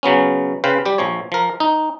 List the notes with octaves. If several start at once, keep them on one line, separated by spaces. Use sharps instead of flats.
C#3 F#3 B3 C#4
C#3 B4 C5 F5 G5
G3 G4
A#1 F3 C#5
F3 A#4
D#4